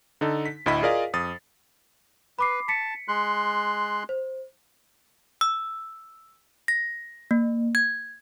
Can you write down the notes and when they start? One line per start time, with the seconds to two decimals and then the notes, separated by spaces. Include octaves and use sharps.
0.21 D3 D#4 A4
0.45 B6
0.66 D2 A2 E4 D#5 B5 B6
0.82 F4 G#4 A#4 D5 D#5 F5
1.14 F2 D#6 A6
2.39 B4 B5 D6 C7
2.68 A5 B6 C#7
3.08 G#3 C6 F#6
4.09 C5
5.41 E6
6.68 A#6
7.31 A#3
7.75 G#6